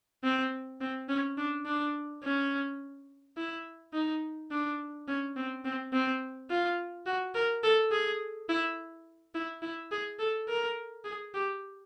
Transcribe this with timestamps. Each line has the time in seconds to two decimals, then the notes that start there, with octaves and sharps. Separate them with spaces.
0.24 C4
0.81 C4
1.09 C#4
1.38 D4
1.66 D4
2.23 C#4
3.37 E4
3.93 D#4
4.51 D4
5.08 C#4
5.36 C4
5.65 C4
5.93 C4
6.50 F4
7.06 F#4
7.35 A#4
7.64 A4
7.91 G#4
8.49 E4
9.35 E4
9.62 E4
9.91 G#4
10.20 A4
10.49 A#4
11.05 G#4
11.34 G4